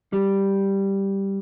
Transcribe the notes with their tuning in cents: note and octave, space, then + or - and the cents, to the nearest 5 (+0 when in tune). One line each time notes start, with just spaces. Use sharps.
G3 +0